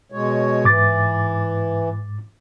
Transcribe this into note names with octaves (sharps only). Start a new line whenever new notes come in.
B2 G#3 C#5
G#2 E3 D6 A6